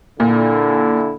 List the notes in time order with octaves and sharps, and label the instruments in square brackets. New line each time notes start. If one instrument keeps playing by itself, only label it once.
[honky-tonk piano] A#2 [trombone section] D3 E4